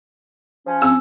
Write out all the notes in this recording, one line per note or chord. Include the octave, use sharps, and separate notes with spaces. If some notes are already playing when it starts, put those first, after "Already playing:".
F3 C#4
C4 E6